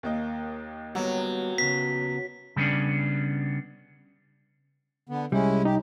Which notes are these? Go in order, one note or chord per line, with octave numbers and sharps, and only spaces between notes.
D#2 A#3 D#5
F#3 G3 B3
C#3 B3 B6
C#3 G3 B3 C#4 D4
D3 B3
C2 G3 G#3 C#4 E4
D#4 G4